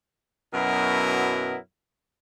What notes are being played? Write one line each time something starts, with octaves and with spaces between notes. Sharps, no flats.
F#2 B2 F#3 B3 E4 A#4